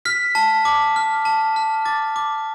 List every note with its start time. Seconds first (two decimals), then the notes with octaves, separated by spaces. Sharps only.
0.05 F6 B6
0.35 A5
0.65 D6
0.96 F6
1.25 A5
1.56 F6
1.85 D6 A6
2.16 D6